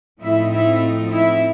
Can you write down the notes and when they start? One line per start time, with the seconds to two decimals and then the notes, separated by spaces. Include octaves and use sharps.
0.21 A2 F3 A3 C4 D#4 E4 E5
0.51 E4 E5
1.12 E4 E5